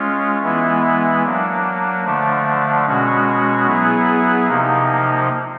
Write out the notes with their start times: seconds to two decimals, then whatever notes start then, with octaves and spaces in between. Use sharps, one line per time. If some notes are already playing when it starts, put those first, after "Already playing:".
Already playing: G#3 C#4 F4
0.42 E3 G#3 B3 E4
1.23 F#3 A#3 D4
2.04 D3 F3 A3 D4
2.85 B2 G#3 C#4 F#4
3.66 F#3 B3 E4 G#4
4.47 C3 F3 A#3 D#4